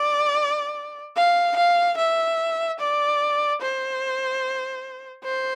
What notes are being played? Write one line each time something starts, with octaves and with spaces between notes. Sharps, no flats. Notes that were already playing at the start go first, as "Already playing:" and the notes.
Already playing: D5
F5
F5
E5
D5
C5
C5